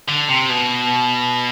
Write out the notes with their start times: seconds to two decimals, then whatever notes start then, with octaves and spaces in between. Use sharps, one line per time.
0.08 D3
0.28 C3
0.49 B2